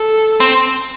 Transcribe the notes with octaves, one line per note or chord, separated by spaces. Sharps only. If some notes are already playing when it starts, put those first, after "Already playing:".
Already playing: A4
C4